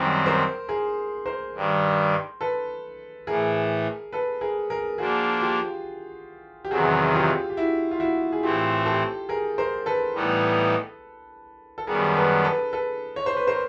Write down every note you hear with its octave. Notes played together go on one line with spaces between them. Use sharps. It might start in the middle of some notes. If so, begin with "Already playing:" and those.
Already playing: F#2 D#3 G3 C4
A#4 C5
G#4 A#4
A#4 C5
G2 D#3 G3
A4 B4
A2 E3 A3 G#4 A#4
A4 B4
G#4 A#4
G#4 A#4
F3 A#3 D4 F#4 G#4
F4 G4
G4
E2 C3 D#3 F#3 F#4 G#4
F4 G4
G4
E4 F#4
F4
E4 F#4
G#4
A2 E3 A3 C4 F4 G4
G4 A4
G#4 A#4
A#4 C5
A4 B4
A2 E3 G3 B3 D#4
A4
F#2 D#3 G3 B3 G#4 A#4
A4 B4
A4 B4
A4 B4
C#5
C5
B4
A#4 C5